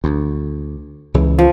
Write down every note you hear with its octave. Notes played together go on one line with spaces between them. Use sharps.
D2
C#2 C#3 E3
F3